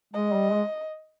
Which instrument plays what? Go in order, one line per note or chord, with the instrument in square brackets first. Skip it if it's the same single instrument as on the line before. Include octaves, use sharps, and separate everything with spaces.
[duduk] G#3 [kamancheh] D#5
[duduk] G3
G#3